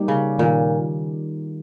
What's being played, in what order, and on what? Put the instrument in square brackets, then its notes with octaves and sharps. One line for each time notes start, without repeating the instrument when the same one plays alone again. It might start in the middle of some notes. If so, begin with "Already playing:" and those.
Already playing: [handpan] G3 A#3 D#4 G4
[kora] C#3
[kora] A#2 [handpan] D#3